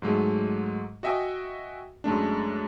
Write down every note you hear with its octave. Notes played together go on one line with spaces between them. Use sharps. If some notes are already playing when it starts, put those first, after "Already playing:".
G#2 F#3 G#3 A3
F#4 D#5 E5 G5 G#5 D#6
F#2 G#3 A3 D4